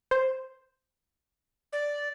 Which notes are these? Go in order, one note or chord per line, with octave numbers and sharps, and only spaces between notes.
C5
D5